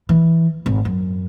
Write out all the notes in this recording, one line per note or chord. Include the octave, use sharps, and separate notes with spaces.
E3
G#1
F#2